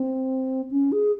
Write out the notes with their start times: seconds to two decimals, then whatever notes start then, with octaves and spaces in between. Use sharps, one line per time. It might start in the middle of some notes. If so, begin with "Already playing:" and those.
Already playing: C4
0.71 C#4
0.92 G#4